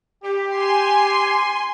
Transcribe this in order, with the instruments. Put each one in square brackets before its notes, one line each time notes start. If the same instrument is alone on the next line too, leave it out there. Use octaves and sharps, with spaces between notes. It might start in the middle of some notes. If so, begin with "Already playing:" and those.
[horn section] G4
[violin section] G#5 C6